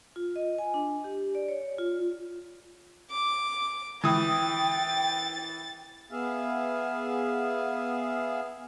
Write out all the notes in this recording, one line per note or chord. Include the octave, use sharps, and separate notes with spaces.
F4
D#5
G#5
D4
G4
D5
C#5
F4
D6
E3 G5 D#6 A6
B3 G#4 E5 F5